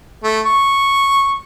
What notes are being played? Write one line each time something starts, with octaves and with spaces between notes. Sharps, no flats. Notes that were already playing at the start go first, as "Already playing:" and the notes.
A3
C#6